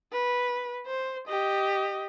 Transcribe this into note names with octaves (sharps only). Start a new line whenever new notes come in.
B4
C5
G4 D#5